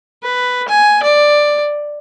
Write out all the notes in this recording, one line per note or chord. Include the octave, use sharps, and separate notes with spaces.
B4
G#5
D5